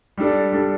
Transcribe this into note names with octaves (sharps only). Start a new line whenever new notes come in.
G3 D4 A4
G3 D4 A4